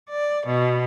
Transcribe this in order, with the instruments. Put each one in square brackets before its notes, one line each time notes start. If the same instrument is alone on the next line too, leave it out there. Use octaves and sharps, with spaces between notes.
[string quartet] D5
B2